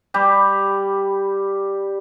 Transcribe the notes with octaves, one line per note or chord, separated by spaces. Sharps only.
G3 G4